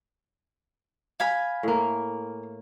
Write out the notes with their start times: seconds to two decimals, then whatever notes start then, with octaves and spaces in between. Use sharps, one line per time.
1.20 F5 G#5 B5
1.63 A2 A#3